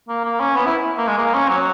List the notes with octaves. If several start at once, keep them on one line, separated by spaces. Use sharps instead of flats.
A#3
A#3
C#4
B3
E4
A#3
G#3
A#3
C#4
F#3